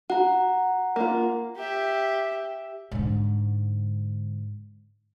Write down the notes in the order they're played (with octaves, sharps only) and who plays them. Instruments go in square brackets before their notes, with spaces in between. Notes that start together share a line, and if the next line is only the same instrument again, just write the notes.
[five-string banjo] F#4 [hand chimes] F#5 A#5
[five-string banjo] A#3 F4
[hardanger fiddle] G4 E5
[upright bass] G#2 D3